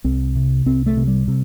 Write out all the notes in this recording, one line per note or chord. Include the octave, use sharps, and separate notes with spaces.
C2 C4
C3
C2 C4
A3
C3
G3
C3